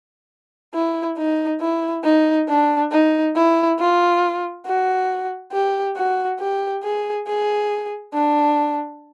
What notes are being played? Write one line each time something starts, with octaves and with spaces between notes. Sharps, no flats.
E4
D#4
E4
D#4
D4
D#4
E4
F4
F#4
G4
F#4
G4
G#4
G#4
D4